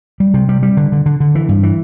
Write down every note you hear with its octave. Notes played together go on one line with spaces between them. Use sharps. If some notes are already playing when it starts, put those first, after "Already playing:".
G3
C3
G3
G3
D3
D3
D3
D3
E3
G2
E3